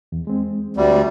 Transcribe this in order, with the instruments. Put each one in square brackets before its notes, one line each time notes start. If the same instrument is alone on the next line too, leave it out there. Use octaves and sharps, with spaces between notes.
[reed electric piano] E2
G#3 C4
[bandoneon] D2 G3